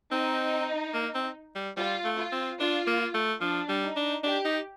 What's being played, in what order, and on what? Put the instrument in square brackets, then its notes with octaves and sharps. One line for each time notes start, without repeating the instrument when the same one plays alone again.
[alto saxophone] C4 [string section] D#4
[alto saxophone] A#3
C4
G3
[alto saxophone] G3 [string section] F4
[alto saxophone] A3
[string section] F4
[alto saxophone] C4
[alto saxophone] D4 [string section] F4
[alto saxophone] A#3
A3
[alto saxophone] F3 [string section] D4
[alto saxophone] G3
[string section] D#4
[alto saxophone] D4
[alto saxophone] D4 [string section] G4
[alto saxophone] D#4